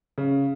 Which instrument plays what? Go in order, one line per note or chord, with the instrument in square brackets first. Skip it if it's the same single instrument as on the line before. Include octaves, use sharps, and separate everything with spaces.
[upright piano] C#3